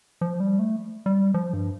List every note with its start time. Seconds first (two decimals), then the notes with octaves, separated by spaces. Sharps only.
0.21 F3
0.40 G3
0.59 A3
1.06 G3
1.34 F3
1.53 G2